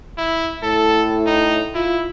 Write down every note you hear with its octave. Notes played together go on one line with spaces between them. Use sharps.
E4
A2 A4
D#4
E4 F4